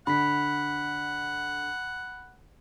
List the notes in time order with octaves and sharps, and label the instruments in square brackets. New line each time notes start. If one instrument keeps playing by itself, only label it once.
[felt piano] D3 [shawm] F#5 [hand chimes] B5 B6